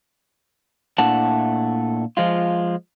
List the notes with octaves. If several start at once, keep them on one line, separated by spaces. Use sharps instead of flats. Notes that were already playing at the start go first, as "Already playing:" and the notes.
A#2 A3 D4 E4 F#5 A5
F3 G#3 F4